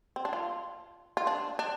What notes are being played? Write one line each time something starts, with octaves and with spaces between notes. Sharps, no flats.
C4
D4
F4
F4
D4
D4